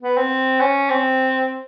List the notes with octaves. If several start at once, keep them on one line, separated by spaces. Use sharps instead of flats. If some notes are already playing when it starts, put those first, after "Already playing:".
B3
C4
C#4
C4